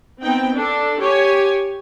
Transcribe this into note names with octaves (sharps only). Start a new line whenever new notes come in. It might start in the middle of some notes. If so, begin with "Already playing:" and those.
B3 C4 D#4 G5
D4 A4
G4 C#5 G#5